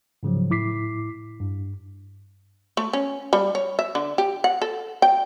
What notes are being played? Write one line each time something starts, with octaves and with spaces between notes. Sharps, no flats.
G#2 C#3 F3 F#3
A2 E4 D6 B6 C7
G2
A3
C#4
G3
C#5
E5
D3
G4
F#5
A4
G5